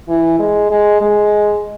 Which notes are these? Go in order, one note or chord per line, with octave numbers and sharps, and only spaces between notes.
E3
G#3
G#3
G#3